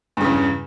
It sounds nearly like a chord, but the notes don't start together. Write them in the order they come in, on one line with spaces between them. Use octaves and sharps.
G2 C#3 E2